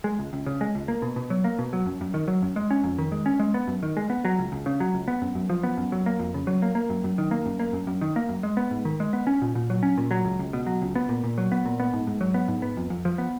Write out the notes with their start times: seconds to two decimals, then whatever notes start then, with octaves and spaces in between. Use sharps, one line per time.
0.04 G#3
0.19 C#2
0.33 C#2
0.46 C#3
0.61 G#3
0.75 C#2
0.88 A#3
1.02 B2
1.16 B2
1.30 F#3
1.44 A#3
1.59 B2
1.73 F#3
1.86 F#2
2.01 F#2
2.14 D#3
2.28 F#3
2.42 F#2
2.56 G#3
2.71 C#4
2.84 F2
2.98 D#3
3.12 G#3
3.26 C#4
3.40 G#3
3.54 B3
3.67 F#2
3.83 D#3
3.97 G#3
4.10 B3
4.25 F#3
4.39 C#2
4.52 C#2
4.66 C#3
4.80 F#3
4.94 C#2
5.08 B3
5.22 F#2
5.35 F#2
5.50 F3
5.63 B3
5.77 F#2
5.92 F#3
6.06 A#3
6.19 F2
6.34 C#3
6.47 F#3
6.62 A#3
6.75 A#3
6.90 F#2
7.04 F#2
7.18 D#3
7.31 A#3
7.46 F#2
7.60 A#3
7.73 F#2
7.87 F#2
8.01 D#3
8.16 A#3
8.29 F#2
8.43 G#3
8.57 B3
8.71 G#2
8.85 D#3
9.00 G#3
9.13 B3
9.27 C#4
9.42 A#2
9.55 A#2
9.70 F#3
9.83 C#4
9.98 A#2
10.11 F#3
10.25 C#2
10.39 C#2
10.53 B2
10.67 F#3
10.82 C#2
10.95 B3
11.09 A#2
11.24 A#2
11.38 F#3
11.52 B3
11.66 A#2
11.80 B3
11.93 G#2
12.07 G#2
12.21 F#3
12.34 B3
12.48 G#2
12.62 B3
12.77 F2
12.90 F2
13.05 F3
13.18 B3